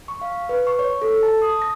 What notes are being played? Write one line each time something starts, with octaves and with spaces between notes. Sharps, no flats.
C#6
F5
B4
C#6
C#5
A4
A5
D#6
A#6